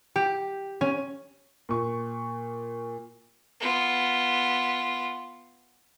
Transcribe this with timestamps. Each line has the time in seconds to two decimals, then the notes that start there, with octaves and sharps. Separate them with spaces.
0.16 G4
0.81 C#4
1.69 A#2 C#6
3.60 B3 F4